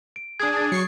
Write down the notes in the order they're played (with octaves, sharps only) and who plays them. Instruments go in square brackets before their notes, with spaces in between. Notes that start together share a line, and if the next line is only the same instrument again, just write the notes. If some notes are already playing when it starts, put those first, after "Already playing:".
[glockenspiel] D7
[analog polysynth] D4 G#4 [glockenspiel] D#6 G#6
[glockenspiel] G#6 A6
[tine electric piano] F#3 [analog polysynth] C#6 C7 C#7